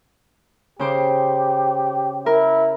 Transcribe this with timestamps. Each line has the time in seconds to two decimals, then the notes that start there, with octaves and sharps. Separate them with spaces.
0.79 C#3 G4 C5 D6
2.26 E4 A#4